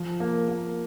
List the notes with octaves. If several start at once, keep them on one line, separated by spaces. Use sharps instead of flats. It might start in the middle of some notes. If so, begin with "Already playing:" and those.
Already playing: F3
A#3
A#3